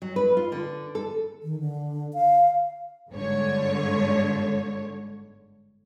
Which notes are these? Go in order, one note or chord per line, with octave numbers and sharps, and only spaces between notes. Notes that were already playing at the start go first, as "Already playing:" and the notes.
F#3
B4
F4
D3
A4
D#3
D3
F5
G1 G#2 D3 C#5